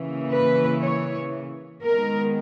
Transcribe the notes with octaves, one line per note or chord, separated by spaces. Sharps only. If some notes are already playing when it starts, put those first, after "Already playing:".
Already playing: C#3 E3 A#3
B4
C#5
D#3 G#3 B3 A#4